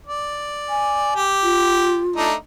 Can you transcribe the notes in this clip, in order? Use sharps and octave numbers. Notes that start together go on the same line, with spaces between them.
D5
G#5
G4
F4
A3 D4 D#4